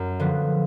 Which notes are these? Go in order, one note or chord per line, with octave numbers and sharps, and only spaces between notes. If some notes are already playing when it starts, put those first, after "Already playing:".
Already playing: F#2
D3 F3 B3